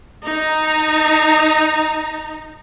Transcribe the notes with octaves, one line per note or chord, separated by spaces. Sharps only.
D#4 A#5